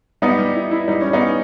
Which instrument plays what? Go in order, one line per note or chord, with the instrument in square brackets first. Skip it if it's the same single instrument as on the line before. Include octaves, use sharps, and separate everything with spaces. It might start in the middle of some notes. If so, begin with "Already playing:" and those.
[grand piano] G3 [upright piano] B3 D#4
[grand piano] G3
E4
E4
[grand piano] G3 [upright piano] D#4
[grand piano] G3 [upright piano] C#4
[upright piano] B3 D#4
[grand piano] C#4